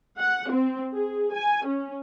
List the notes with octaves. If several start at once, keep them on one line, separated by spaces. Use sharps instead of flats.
F#5
C4
G#4
G#5
C#4